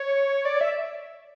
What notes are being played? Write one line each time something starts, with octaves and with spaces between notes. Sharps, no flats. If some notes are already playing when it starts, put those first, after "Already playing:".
Already playing: C#5
D5
E5